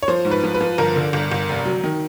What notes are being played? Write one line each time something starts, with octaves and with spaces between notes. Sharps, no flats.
C#5
F3 C5
G#2
B4
F3
B4
F3
G1 A#4
D3
G1
G1
F1
F#3
D#3